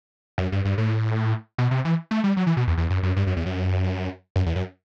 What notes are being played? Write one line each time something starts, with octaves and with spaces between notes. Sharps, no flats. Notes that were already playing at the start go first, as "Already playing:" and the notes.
F#2
G2
G2
A2
B2
C3
E3
A3
G3
F#3
E3
B2
E2
E2
F#2
F#2
G2
F#2
E2
F#2
F#2
E2
F#2